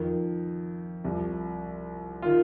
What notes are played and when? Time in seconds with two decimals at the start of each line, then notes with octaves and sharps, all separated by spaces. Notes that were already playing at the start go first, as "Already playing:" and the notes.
Already playing: F2 D#3
1.04 C2 C3 F3
2.22 D#3 F4